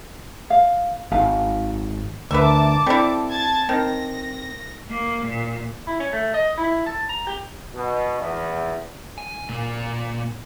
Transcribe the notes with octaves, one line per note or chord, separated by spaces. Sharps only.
F5
G#1 F5
D2 A#4 B4 E5 A5 D6
G3 C4 E4 A4
A5 G#6 A6
D#3 C4 A#6
A#3
A#2
E4
C#4
A3
D#5
E4
A5
A#5
G4
B2
E2
G#5
A#2